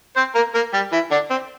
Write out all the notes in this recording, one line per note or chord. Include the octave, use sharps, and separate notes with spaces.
C4 C5
A#3 A#4
A#3 A#4
G3 G4
E3 E4
D3 D4
C4